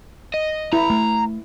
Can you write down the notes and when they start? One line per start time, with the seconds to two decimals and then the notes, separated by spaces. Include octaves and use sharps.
0.34 D#5
0.73 E4 A#5
0.90 A3